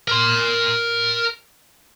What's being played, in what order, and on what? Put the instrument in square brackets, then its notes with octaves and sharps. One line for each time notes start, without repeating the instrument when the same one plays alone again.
[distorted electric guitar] A#4 C6